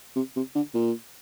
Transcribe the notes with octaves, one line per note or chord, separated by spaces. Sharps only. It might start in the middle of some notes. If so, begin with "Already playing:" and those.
C3
C3
D3
A#2